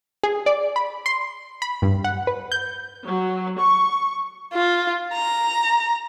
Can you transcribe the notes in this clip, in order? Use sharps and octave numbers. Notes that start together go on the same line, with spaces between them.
G#4
D5
B5
C6
B5
G2
F#5
B4
G6
F#3
C#6
F4
A#5